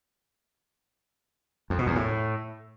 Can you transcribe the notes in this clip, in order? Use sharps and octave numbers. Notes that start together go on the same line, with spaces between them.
F2
B2
E2
A2